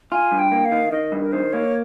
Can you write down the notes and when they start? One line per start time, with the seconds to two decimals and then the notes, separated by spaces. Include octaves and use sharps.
0.12 F4 G#5
0.32 G2
0.39 G5
0.52 A#3
0.65 F5
0.72 D#3
0.92 D#3 D#5
1.12 G2
1.22 A#4
1.32 D#3 C5
1.53 A#3 C#5